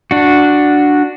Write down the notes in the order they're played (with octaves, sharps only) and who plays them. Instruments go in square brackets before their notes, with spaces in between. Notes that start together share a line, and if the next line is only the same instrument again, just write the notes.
[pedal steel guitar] D4 F#4